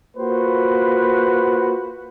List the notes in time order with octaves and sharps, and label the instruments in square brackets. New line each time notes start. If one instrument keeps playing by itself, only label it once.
[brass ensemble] A#3 F4 F#4 B4 C5